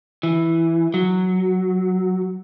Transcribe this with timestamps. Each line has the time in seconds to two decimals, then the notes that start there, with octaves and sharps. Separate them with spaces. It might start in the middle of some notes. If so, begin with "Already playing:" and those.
0.23 E3
0.94 F#3